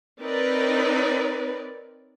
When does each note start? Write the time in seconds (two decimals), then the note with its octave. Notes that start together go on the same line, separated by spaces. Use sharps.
0.21 C4 D#4 A#4 B4 C#5 D5